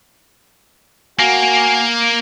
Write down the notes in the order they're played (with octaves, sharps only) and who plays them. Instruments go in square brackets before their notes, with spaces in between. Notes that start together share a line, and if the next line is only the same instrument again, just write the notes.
[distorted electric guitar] A#3 [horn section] F#4 G#5